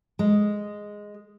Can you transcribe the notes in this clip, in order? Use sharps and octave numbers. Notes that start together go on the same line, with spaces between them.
G#3